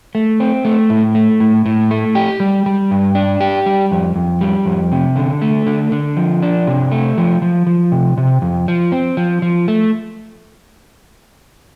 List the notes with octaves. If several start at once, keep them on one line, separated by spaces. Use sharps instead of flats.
A3
C4
A3
A2
A3
A2
A2
A3
G4
G3
G3
G2
D4
G4
G3
F2
F2
G3
F2
C3
D3
A3
D3
D3
F3
D4
C3
A3
F3
F3
F3
C3
C3
F2
F3
C4
F3
F3
A3